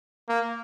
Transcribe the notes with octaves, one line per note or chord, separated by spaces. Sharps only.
A#3